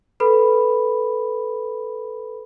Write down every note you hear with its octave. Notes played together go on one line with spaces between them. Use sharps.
A4 B4 B5